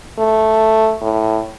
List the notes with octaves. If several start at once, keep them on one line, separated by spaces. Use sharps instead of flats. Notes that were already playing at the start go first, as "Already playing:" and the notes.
A3
A2